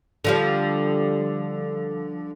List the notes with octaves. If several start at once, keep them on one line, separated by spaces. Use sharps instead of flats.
D3 F3 G3